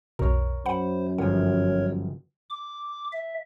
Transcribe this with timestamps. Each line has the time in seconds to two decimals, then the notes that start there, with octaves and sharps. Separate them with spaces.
0.19 B1 F2 B2 A#4 C#5
0.66 F#2 C5 F#5 B5
1.18 G1 F3 A#4 C#5 F#5
2.50 D6
3.13 E5